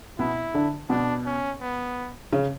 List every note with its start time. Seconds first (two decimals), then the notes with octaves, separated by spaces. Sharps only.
0.19 B2 B3 E4
0.54 D3 D4
0.89 B2 B3 D4
1.26 C#4
1.61 B3
2.33 C#3 C#4